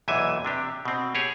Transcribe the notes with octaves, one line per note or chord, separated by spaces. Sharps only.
B1 E2 A#2 E3 E5 G#5
C3 D4 G4
B2 C4
G4 G#4 C#5